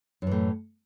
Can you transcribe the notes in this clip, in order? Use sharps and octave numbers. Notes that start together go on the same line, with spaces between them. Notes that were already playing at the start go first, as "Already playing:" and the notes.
F#2 A2 E3